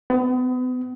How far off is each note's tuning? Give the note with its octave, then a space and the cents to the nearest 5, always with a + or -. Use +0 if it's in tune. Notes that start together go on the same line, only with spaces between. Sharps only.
B3 +35